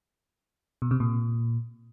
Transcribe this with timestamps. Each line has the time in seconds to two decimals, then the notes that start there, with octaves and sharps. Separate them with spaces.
0.82 B2
0.91 C3
1.00 A#2